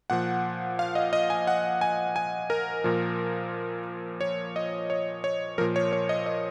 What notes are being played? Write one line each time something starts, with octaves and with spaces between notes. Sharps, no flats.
A#2 F3 F#5
F5
D#5
D#5
G#5
F#5
G#5
G#5
A#4
A#2 F3
C#5
D#5
C#5
C#5
A#2 F3 A#4
C#5
C#5
D#5
D#5